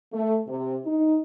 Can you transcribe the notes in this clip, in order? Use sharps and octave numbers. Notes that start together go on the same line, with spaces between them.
A3
C3
D#4